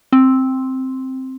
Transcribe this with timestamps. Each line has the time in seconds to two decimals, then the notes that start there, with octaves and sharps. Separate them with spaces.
0.12 C4